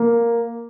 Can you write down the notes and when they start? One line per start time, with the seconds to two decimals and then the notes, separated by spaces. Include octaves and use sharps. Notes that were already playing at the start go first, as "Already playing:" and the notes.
Already playing: A#3